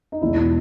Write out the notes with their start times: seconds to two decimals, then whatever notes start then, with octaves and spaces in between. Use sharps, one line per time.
0.12 D#4
0.22 E2 B2 G#3 E4